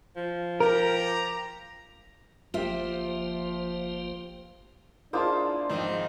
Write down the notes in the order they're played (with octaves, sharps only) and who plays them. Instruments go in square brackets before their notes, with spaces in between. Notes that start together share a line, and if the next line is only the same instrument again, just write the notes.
[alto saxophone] F3
[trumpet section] G4 A#5 [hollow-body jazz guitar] A#4
[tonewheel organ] G1 A#3 C5 [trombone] F3 [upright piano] F4 G4 [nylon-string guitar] E5
[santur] G#3 A#3 C5 [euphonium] D4 [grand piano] E4 F4 A5
[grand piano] G#2 F3 D#4 [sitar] D#3 C4